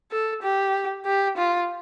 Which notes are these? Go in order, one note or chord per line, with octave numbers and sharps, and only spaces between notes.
A4
G4
G4
F4